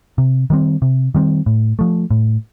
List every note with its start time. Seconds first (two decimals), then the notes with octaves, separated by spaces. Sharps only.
0.18 C3
0.50 D#3 G3 C4
0.82 C3
1.15 D#3 G3 C4
1.46 A2
1.79 F3 A3
2.11 A2